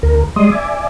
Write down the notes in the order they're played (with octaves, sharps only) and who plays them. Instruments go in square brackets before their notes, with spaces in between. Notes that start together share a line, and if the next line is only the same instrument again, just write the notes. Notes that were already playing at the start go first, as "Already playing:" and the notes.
[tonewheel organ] D2 A#4
G3 G#3 D5 D#5 C6 D#6
D5 E5 G#5 D6